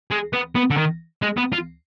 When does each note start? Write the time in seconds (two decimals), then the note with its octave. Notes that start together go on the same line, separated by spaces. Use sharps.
0.10 G#3
0.33 B3
0.55 B3
0.71 D3
0.77 D#3
1.22 G#3
1.37 B3
1.52 F4